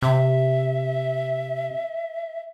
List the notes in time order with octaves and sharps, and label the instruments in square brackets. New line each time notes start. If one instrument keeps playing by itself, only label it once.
[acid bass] C3 [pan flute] E5